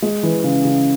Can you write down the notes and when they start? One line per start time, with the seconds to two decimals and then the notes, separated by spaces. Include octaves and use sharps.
0.02 G#3
0.23 E3
0.44 C#3
0.65 C#3